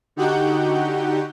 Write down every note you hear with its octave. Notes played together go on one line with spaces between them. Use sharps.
D3 D#4 F#4 G4 F#5 G6